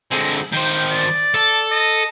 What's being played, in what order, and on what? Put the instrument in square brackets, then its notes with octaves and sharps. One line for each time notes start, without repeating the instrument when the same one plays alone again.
[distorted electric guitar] D3 G#3 [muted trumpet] C4
[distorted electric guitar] D#3 C5 [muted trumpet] G5
[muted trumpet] D5
[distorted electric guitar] A4
[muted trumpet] D#5